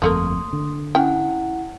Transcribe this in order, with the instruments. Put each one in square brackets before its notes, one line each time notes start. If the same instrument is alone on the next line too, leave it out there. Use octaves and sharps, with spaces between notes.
[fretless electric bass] G1 F2 [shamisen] F3 A3 A#3 [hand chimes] C6 D#6
[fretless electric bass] D3
[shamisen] C#4 G5 [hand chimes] E4 F#5